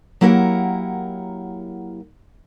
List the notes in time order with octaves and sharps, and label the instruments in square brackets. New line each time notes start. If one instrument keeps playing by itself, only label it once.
[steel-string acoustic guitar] F#3 A#3 E4 G4 A#4 F#5